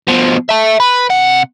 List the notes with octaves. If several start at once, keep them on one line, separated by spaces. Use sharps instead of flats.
B2 F3
E5 A5
B4
C3 F#5